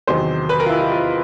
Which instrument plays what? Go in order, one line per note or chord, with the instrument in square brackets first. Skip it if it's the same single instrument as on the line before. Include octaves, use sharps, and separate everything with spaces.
[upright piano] E2 C3 D#3 F#3 C5
B4
A#4
F4
E4
F4
F4